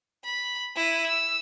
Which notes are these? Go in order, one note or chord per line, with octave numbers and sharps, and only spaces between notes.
B5
E4 D#7
E6